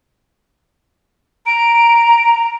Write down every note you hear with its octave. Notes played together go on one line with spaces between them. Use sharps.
A#5 D7